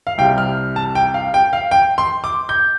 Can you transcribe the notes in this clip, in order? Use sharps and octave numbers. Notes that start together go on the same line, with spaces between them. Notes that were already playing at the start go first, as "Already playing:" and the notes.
F5
C2 C3 G3 G5
F6
A5
G5
F5
G5
F5
G5
C6
D6
G6